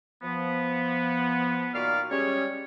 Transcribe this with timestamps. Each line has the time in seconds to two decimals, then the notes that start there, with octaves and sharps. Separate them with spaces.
0.22 F3 B3
1.73 A#2 D#3 F#4 D5 F5 F6
2.10 G3 G#3 C#4 G#4 C#5